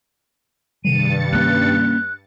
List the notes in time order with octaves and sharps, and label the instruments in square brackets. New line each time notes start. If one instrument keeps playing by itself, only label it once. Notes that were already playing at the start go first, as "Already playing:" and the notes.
[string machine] G2 A6 C#7 [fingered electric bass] C3 D#3 G3 [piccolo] D#7
[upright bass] A#3 C#4 [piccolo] F#6